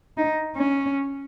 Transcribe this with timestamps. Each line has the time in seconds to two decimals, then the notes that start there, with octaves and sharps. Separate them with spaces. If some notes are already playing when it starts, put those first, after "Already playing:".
0.17 D#4
0.56 C#4